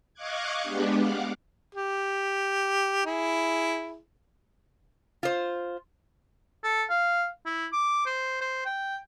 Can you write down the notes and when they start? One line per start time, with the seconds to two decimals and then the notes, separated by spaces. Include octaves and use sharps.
0.14 D#5 F5 C#6 D6 F#6 G#6
0.62 G#3 B3 D4 G4
0.97 F5 F#5 D6
1.75 G4
3.06 E4 G#4
5.23 F4 C5
6.64 A4
6.90 F5
7.46 E4
7.73 D6
8.06 C5
8.41 C5
8.66 G5